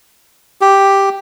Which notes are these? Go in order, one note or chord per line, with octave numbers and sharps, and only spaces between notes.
G4